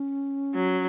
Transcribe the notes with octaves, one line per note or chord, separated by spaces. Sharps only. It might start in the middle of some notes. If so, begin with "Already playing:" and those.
Already playing: C#4
F#3